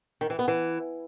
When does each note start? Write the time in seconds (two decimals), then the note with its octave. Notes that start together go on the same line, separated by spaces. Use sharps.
0.21 D#3
0.30 E3
0.39 B3
0.48 E3